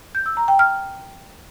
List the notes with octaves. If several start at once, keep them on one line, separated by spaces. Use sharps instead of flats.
G6
E6
A#5
G5
F6